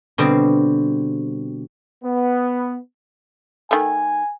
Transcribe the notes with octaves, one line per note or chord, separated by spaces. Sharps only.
B2 D3 G3 C4
B3
D#3 A3 G#5